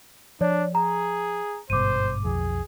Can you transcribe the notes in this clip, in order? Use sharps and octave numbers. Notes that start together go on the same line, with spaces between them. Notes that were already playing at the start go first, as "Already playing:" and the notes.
F3 D4 C#5 D5
G#4 A#5
G#1 G2 B2 C5 D6 D#7
B1 F2 G#4